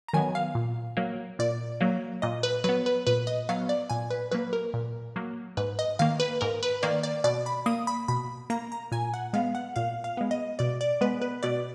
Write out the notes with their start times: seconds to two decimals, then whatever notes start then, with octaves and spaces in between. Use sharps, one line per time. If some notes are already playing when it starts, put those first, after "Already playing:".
0.08 A#5
0.13 D#3 F#3 B3 G#5
0.35 F5
0.55 A#2
0.97 F#3 A#3
1.39 A#2 D5
1.81 F#3 A#3
2.22 A#2 D#5
2.43 B4
2.64 F#3 B3 B4
2.86 B4
3.07 A#2 B4
3.27 D#5
3.49 F#3 B3 F5
3.69 D5
3.90 A#2 G#5
4.10 B4
4.32 F#3 A#3 B4
4.53 A#4
4.74 A#2
5.16 F#3 A#3
5.57 G#2 B4
5.79 D#5
5.99 D#3 A#3 F5
6.20 B4
6.41 G#2 A#4
6.63 B4
6.83 D#3 A#3 D5
7.03 D5
7.24 B2 D5
7.46 B5
7.66 A#3 D#6
7.87 B5
8.08 B2 B5
8.50 A#3 A#5
8.72 A#5
8.92 A#2 G#5
9.14 F#5
9.33 G#3 B3 F5
9.55 F#5
9.76 A#2 F5
10.04 F5
10.17 G#3 B3
10.31 D#5
10.59 B2 D5
10.81 D5
11.01 G#3 B3 B4
11.22 B4
11.43 B2 D5